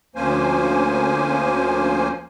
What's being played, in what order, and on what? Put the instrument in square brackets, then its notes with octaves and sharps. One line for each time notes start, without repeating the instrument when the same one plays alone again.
[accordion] D2 F3 A#3 C#4 C5 G#5